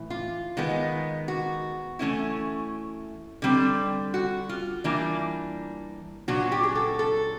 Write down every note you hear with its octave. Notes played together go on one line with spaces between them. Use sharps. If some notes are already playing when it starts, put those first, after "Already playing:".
Already playing: A2 E3
F4
D#3 G#3 B3
F#4
E3 A3 C#4 E4
D3 G3 C4
F#4
F4
E3 G3 A#3 D4
A#2 F#3 B3 D4 F#4
G4
G#4
A4
A4